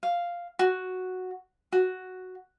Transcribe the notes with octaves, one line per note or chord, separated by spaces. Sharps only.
F5
F#4
F#4